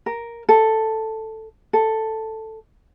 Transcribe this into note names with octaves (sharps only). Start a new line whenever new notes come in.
A#4
A4
A4